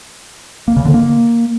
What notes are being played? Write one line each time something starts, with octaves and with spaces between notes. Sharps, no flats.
A#3
C#3
D3
A#3